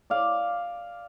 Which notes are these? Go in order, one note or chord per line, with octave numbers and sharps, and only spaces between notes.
D5 F5